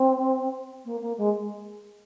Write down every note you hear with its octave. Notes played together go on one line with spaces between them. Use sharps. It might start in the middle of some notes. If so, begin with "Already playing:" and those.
Already playing: C4
A#3
A#3
G#3